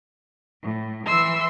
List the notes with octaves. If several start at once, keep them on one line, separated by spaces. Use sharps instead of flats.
A2
E3 E5 C6 E6